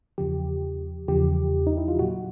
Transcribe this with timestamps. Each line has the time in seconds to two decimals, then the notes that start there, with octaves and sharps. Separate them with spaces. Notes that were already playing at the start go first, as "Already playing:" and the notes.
0.18 E2 C#3 F3 G4
1.08 E2 C#3 F3 G4
1.67 D#4
1.77 E4
1.88 F4
1.99 A#2 F#3 F#4